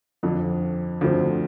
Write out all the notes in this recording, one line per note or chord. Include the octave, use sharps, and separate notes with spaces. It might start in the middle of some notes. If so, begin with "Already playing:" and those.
F2 D3 F3
D2 D3 F3 A3 C4